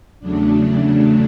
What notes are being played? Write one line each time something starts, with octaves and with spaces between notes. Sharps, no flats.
E2 C#3 F#3 A3 D4